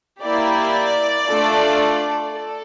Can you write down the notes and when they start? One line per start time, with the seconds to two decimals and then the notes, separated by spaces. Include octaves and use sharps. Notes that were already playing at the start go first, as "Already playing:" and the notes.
0.23 A#3 E4 G4 D5
1.28 A3 D4 F4 A4
2.34 A4